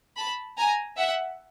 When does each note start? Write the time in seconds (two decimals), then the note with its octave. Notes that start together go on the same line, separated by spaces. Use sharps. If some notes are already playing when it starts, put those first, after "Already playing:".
0.17 A5 B5
0.57 G#5 A#5
0.97 E5 F#5